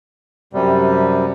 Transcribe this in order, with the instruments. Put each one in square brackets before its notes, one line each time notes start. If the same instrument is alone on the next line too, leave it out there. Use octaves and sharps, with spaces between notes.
[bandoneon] F#2 C3 G3